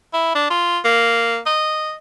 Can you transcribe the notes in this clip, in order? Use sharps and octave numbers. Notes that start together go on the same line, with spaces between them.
E4
D4
F4
A#3
D#5